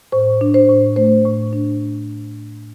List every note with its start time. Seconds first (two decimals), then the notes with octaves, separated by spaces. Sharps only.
0.12 A2 C5
0.41 D4
0.54 C5
0.69 A2
0.96 A3 C5
1.25 A2
1.53 D4